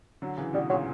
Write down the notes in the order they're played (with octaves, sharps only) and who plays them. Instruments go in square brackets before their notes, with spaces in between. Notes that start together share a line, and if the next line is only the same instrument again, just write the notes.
[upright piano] D3 F#3
C#3 E3
[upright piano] B2 D3 [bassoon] G3
[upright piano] A#2 C#3 [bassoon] F#3